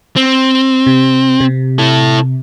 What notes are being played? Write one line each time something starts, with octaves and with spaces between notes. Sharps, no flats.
C4
C3
C3
E4 A4